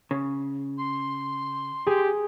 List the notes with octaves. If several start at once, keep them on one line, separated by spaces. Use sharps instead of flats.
C#3
C6
G4 G#4